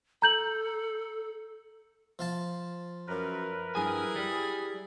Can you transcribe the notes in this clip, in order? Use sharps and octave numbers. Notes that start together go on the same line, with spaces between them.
A4 A#5 G6 F#7
F3 F5 A5
F#2 A#4 B4
G2 E4 G#4 G#5
G3